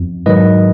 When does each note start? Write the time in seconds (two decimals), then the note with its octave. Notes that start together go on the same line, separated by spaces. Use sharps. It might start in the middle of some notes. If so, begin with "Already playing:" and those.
Already playing: F2
0.26 G#2 D#3 F#3 B4 D#5